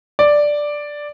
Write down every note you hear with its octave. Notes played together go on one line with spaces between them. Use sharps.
D5